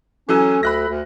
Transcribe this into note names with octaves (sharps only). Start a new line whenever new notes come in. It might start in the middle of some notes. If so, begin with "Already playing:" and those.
E3 F#3 C#4 A4 G#5 E6
D2 B5 F#6 A#6
D2